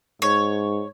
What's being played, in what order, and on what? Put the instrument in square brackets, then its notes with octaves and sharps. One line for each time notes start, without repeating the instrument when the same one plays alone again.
[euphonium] G#2 [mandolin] C#5